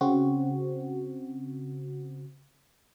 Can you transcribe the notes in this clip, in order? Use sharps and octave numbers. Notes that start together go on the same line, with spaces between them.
C#3 C4 F#4